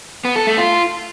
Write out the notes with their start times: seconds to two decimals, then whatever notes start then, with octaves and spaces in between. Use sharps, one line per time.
0.25 B3
0.36 A4
0.47 A3
0.58 F4